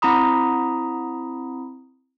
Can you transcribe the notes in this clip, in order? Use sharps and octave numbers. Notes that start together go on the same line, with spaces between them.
C4 E4 A#5 B5 D#6